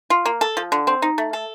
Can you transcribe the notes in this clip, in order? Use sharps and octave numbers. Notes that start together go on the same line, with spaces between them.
F4
A#3
A4
F3
D3
C4
D#4
A3
A4